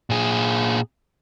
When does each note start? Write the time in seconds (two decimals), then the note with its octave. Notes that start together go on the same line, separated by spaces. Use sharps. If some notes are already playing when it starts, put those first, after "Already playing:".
0.10 A#2 G#4